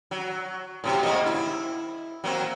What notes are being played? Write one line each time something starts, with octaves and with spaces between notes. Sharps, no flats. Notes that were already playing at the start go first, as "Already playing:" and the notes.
F#3
A2 C3 F#3
G#2 A#3 D#5
E4
F#3 A#3 C4